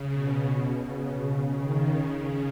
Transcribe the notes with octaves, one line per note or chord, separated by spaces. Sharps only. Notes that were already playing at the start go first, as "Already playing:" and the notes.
Already playing: C#3
B2
C#3
D#3
C#3